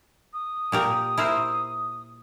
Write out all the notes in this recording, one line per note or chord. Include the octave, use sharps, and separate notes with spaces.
D#6
A#2 G4 A#4
E4 A#4 C5